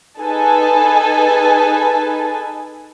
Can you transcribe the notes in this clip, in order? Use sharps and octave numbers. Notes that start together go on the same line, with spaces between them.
D#4 G#4 A4 B4 G#5 A5